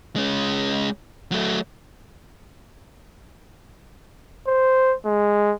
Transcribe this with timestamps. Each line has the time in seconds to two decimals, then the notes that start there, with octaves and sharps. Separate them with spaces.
0.16 G#3 C#4
1.32 F#3 A3
4.47 C5
5.06 G#3